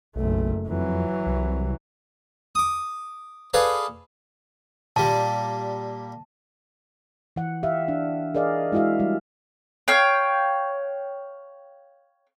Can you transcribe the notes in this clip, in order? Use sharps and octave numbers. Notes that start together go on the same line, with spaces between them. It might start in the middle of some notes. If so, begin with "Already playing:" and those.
F#1 B1 A3
F2 E3 F#3
C2
D6 D#6
G#4 A4 B4 D5 F5 A5
A#2 G3 A5
E3 F#5
G4 E5 F5
D4
G#4 A#4 D5 D#5 F5
G#3 E4 F#4 E5 F5
G3
C#5 F5 G5